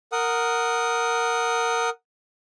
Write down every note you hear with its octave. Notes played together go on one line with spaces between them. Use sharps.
A#4 F#5 D#6